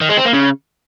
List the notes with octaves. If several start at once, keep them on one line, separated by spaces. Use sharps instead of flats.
D#3
G#3
C4
A#3
C#3